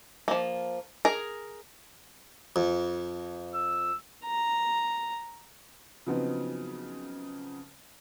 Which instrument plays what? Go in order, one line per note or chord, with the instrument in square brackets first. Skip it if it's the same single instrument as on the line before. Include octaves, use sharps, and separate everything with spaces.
[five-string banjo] F3 A#3
G#4 A#4
[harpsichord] F2
[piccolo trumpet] E6
[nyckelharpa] A#5
[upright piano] C#3 F3 F#3 B3 C4 D#4